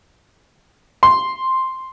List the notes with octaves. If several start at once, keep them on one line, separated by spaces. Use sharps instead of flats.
C6